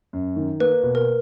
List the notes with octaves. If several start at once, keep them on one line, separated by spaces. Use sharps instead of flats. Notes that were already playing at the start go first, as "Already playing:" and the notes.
F#2
D#3
A#3 B4
B2
A#4